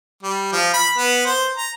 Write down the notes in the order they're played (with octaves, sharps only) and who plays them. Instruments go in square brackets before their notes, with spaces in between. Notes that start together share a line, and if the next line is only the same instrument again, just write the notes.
[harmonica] G3
F3
B5
B3
C5
A#5